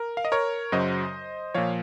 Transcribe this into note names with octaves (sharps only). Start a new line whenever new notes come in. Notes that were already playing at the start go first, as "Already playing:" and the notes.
Already playing: A#4
F5
D#5
A#4 C#5
F#2 C#3 F#3 C5 D#5
A#2 F3 C#5 F5